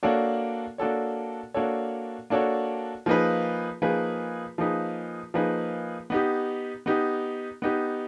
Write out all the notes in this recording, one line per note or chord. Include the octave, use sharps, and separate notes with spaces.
A#3 D4 F#4 A4 C#5
A#3 D4 F#4 A4 C#5
A#3 D4 F#4 A4 C#5
A#3 D4 F#4 A4 C#5
F3 A#3 D#4 G#4 B4
F3 A#3 D#4 G#4 B4
F3 A#3 D#4 G#4 B4
F3 A#3 D#4 G#4 B4
B3 D#4 G4
B3 D#4 G4
B3 D#4 G4